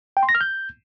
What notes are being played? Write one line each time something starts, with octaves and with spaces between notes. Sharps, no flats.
G5
C6
A#6
F6
G6